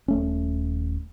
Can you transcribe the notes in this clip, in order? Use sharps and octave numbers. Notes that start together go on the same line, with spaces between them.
D#1 A3 C#4